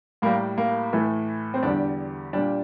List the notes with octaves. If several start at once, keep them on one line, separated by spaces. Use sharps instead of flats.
A2 G3 A#3
A#3
A2 E3 A3
C4
E2 D3 G3 D4
A#2 G3 D4